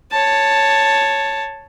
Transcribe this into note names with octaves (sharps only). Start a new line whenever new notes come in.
C#5 A5